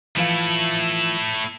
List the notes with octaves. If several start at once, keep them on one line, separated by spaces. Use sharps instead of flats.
E3 F3 A3 E4 F5